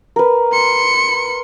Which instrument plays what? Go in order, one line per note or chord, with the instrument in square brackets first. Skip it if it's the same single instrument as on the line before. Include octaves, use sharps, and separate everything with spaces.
[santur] A#4 B4
[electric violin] C6 C#7